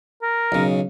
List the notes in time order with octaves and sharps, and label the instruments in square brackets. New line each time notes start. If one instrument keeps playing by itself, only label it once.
[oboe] A#4
[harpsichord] B1 C#3